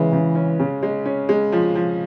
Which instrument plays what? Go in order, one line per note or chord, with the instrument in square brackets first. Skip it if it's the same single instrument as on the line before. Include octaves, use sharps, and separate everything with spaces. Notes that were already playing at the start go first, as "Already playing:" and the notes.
Already playing: [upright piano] C#3 G#3 [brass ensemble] E3
[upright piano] C#3
C#4
C#3
G#3
C#4
G#3
F3
F3